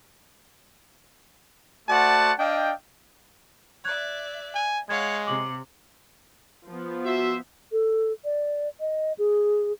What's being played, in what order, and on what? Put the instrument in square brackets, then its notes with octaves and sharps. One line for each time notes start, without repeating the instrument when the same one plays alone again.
[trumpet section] A3 F#4 C5 D5 F#5 A5
D4 D#5 F5 G5
[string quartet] D5 E5 [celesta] F#6 G#6
[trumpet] G#5
[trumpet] G#3 [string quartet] C#5 F5 F#5 [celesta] G#6
[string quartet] C3 [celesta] D6 F#7
[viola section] F3 B3
[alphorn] F#4 [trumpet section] C5 E5
[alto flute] A4
D5
D#5
G#4